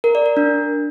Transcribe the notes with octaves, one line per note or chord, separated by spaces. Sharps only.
A#4
D5
A#4
D4